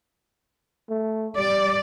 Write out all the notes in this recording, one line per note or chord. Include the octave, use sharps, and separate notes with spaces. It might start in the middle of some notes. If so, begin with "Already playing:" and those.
A3
G3 D5